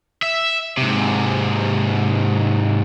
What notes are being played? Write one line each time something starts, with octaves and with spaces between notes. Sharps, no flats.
E5
G#2 C3